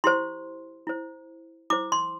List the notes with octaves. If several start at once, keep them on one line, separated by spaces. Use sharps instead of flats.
E4 G4 C5 C6
E4 C5
E4 C5 D6
C6